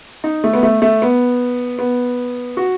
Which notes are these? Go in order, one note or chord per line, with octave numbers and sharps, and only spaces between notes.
D#4
A3
B3
A3
A3
B3
B3
F#4